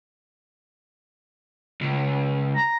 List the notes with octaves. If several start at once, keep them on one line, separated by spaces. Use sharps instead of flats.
C#2
A#5